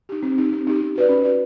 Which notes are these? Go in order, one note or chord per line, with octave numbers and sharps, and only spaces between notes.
D#4 G4
C4
D#4 G4
C4
D#4 G4
C#4
F#4 B4 D5
C#4
F#4 B4 D5